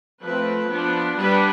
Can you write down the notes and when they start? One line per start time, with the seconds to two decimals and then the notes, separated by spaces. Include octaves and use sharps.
0.22 F3 A3 C4 B4
0.70 F3 B3 D4
1.18 G3 B3 D4 B4